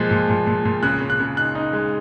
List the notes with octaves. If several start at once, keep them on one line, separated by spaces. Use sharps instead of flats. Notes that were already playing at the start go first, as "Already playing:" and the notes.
Already playing: A#2 F3 G#3 F#6
A#2
A#2
A#2
A#2
C#3 F#6
C#3
F#6
C#3
D#4 F#6
D#4
G#3